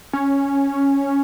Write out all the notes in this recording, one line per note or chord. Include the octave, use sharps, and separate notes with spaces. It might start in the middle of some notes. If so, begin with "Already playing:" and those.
C#4